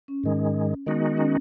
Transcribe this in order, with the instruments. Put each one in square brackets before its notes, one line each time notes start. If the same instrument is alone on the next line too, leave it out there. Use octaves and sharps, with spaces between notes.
[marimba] C#4
[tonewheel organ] G#2 D#3 G#3
[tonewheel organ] D#3 G#3 D#4 F#4 [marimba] B3
[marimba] C#4